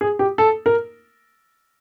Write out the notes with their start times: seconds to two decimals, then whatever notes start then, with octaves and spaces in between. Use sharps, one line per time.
0.01 G#4
0.19 G4
0.38 A4
0.66 A#4